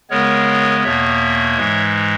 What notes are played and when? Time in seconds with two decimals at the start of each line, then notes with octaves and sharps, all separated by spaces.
0.10 C#3 G#3 B3 A#4 C#5
0.83 E2 B2 A#3 C#5 E5
1.57 G#2 E3 G#3